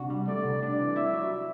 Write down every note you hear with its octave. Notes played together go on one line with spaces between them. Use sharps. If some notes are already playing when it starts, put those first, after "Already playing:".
Already playing: C3 D4 F#4
G3
A3 D5
C3
D4 D5
E3
E4 E5
F#3
F#3